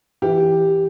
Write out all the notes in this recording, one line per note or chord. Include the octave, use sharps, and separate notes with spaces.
E3 G4